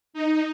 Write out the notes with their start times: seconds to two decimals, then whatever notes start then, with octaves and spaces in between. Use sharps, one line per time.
0.13 D#4